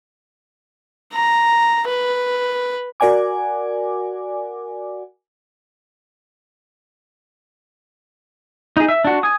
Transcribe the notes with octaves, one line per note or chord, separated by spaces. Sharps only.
A#5
B4
F#4 A#4 D5 F#5 G#5 D6
D#4 G#4
E5
D4 F#4
G#5 D#6